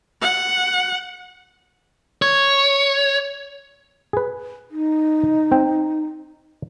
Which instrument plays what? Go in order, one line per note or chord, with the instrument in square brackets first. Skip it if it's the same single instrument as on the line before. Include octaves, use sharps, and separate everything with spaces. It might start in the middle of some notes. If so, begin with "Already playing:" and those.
[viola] F#5
[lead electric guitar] C#5
[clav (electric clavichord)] G#4 B4
[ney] D#4
[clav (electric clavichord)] C4 G5